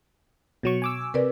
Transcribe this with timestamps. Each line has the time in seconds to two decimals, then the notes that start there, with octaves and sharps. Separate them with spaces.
0.63 B2 F#3 C#6
0.82 G#5 D6 E6
1.14 C3 A#4 B4 D5